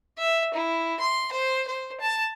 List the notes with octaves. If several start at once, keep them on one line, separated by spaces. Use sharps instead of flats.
E5
E4
C6
C5
C5
A5